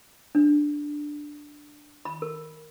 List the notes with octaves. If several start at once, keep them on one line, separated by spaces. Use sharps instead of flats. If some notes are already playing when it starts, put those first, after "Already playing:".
D4
B5
A#4